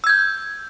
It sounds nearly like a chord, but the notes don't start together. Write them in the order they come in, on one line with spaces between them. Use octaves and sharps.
E6 G#6 G6